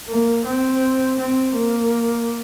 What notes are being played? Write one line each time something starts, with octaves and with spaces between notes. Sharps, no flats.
A#3
C4
C4
A#3